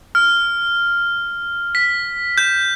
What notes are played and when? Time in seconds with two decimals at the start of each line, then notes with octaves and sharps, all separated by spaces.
0.15 F6
1.75 B6
2.38 G6